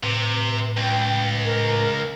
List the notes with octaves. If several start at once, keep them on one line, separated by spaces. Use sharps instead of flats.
A2 C3 B4
C#2 G5
A#4